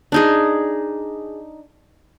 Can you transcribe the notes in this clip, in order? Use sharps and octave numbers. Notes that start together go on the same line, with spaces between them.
D4 D#4 G#4